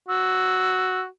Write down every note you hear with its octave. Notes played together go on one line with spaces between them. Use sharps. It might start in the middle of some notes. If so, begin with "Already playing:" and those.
F#4 E6